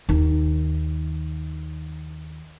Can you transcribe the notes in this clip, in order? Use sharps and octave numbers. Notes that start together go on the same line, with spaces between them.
D#2 D#3